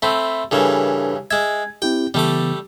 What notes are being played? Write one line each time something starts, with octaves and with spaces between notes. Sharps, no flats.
A3 C4 E5 B5 C6
G2 C#3 E3 D4 A4 A#4
G#3 E5 G#6
C4 E4 G4 G5
C#3 E3 G3 A3 B3 D6